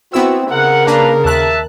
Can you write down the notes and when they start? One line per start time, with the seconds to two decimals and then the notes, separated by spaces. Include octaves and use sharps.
0.13 B3 C4 E4 F#4 E6
0.51 C#3 A#4 F#5
0.87 A#3 D4 B4 F5 A#5
1.25 D#2 E5 A5 F#6